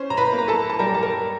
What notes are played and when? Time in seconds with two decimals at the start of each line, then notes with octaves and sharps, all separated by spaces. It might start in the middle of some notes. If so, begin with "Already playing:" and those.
Already playing: C#4 C5
0.10 A#5
0.17 B4 B5
0.33 A#3
0.39 A#5
0.48 A4 A5
0.70 A5
0.79 G3 A#4 A#5
0.94 A5
1.03 A#4 A#5